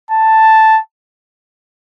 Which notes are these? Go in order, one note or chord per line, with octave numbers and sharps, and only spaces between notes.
A5